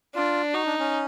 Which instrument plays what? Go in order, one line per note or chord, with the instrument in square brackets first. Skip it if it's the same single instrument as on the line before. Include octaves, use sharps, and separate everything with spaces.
[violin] D4 [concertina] F4
[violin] D#4 [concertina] F#4
[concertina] D4
C#4